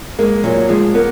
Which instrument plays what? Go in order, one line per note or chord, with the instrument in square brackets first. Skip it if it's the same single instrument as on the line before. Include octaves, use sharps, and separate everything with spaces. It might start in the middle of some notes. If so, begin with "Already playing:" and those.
[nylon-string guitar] G#3 [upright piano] A#3
[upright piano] A#2 [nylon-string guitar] F#3
[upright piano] F3 [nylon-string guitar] G#3
[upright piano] A#3 [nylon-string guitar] B3